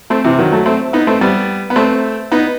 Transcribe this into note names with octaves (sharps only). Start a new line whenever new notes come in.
A3 C4
C3 E3
D#3 F#3
F#3 A3
A3 C4
B3 D#4
A3 C4
G3 B3
B3
A3 C4
B3 D#4